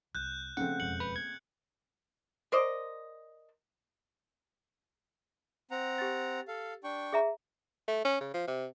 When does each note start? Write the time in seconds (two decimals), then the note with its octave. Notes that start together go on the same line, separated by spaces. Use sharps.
0.15 C2 F#6 G6
0.57 C#3 F3 A3 A#3 C4 F#5
0.80 E1 F2 C#7 F#7
1.00 B4
1.16 A#3 G#6
2.52 A#4 C5 D5 D#5
5.71 C4 F#5 A#5
5.98 G4 A6
6.48 A4 F5
6.84 D4 G5 C#6
7.13 G#4 E5 A#5
7.88 A3
8.05 C#4
8.21 C#3
8.34 F3
8.48 C3